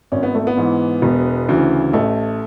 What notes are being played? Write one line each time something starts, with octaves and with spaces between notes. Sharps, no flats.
G#1 C#4
B3
A3
B3
G#2 E3
E1
D2 C#3 E3
A1 A3